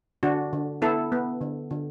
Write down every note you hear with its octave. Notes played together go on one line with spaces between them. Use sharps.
D3 D4 F#4
D3
B3 E4 A4
B3
D3
D3